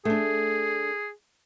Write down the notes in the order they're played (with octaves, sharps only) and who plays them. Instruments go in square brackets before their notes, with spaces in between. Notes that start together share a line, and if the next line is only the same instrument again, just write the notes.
[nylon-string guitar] A3 D4 [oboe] G#4